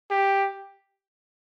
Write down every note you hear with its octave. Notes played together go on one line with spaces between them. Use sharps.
G4